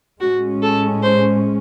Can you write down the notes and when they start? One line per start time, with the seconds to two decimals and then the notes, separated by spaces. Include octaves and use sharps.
0.21 A2 G#3 C#4 F#4
0.63 A4
1.03 C5